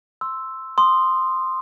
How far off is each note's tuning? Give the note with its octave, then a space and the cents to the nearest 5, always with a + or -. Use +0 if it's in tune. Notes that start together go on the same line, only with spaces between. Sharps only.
C6 +0 E6 +0
C6 +0 D#6 -15